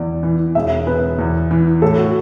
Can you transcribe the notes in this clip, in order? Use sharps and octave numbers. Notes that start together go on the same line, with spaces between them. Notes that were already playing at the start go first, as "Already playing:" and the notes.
Already playing: E2 D5
E3
E1 E5
B3 B4
E2
E3
A2 A4
F#4